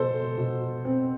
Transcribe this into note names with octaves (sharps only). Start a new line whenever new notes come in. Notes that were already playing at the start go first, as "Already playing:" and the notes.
Already playing: B2 A4 C5
B2
C4